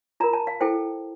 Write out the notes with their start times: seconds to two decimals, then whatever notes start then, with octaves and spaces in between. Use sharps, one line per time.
0.20 F4 A#4 A#5
0.33 A5
0.47 F5
0.61 E4 A4 C5 G5